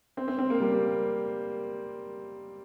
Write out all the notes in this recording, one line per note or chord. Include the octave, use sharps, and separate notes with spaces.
C4
C4
C4
A#3
G3